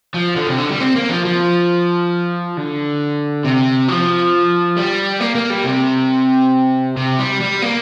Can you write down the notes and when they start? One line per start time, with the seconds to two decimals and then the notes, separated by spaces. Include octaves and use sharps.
0.14 F3
0.36 D3
0.47 C3
0.58 D3
0.69 G3
0.80 C4
0.95 A#3
1.09 F3
1.25 F3
2.57 D3
3.44 C3
3.89 F3
4.77 G3
5.20 A#3
5.35 A#3
5.50 G3
5.64 C3
6.97 C3
7.19 G3
7.41 G3
7.62 A#3